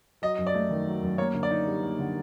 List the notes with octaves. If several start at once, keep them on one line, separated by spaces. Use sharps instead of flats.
F#3 D#5
F#2
D5
A3
D#3
F#3
F#2
A#3 C#5
D3
D5
D#4
G3
A#3
D3